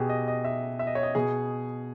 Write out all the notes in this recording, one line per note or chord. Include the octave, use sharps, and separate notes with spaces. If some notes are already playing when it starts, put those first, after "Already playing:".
Already playing: B2 G4 G#4
D#5
D#5
E5
E5
D#5
C#5
D#5
B2 G#4